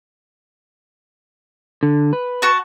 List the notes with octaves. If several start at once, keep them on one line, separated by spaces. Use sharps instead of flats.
D3
B4
F#4 A5 C#6